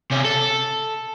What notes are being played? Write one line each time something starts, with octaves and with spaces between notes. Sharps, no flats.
C3 C#4
A4